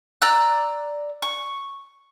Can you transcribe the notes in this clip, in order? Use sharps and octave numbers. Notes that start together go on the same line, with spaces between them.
D5 A#5 E6 F#6
C#6